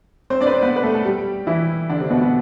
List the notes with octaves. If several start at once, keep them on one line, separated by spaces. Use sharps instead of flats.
C4 C5
D4 D5
B4
C4 C5
B3 B4
B4
A3 A4
A4
G3 G4
E3 E4
D3 D4
C3 C4
B2 B3
B2 B3